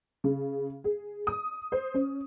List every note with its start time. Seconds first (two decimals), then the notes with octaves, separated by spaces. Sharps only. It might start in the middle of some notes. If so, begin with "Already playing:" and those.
0.24 C#3
0.84 G#4
1.27 D#6
1.72 C5
1.94 C#4